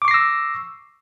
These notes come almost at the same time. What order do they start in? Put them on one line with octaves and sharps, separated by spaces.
D6 C#6 C7 A#6 E6